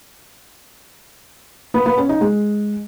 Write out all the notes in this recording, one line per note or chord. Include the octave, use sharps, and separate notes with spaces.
B3
B3
C#4
D#4
G#3